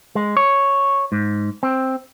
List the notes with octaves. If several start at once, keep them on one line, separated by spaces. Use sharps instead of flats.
G#3
C#5
G#2
C4